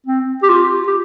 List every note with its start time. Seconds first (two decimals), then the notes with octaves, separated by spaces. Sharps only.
0.06 C4
0.42 G4
0.49 F4
0.87 G4